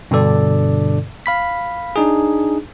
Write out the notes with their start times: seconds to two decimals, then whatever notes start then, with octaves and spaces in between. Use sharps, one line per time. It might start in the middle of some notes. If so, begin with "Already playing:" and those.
0.11 G2 B2 D3 A4 D5
1.26 F5 B5 B6
1.96 D4 D#4 G#4